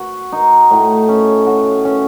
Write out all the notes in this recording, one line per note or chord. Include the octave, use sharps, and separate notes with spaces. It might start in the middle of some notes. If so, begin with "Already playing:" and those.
Already playing: F#4
D#4
A2
C#4
F#4
C#4